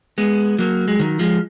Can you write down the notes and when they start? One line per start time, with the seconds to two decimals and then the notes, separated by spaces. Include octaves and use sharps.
0.18 G#3 B3
0.59 F#3 A#3
0.88 G#3
0.99 D#3 F#3
1.19 F3 G#3